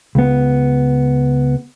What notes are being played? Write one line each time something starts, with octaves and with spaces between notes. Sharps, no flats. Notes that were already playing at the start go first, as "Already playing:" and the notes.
C#2 B3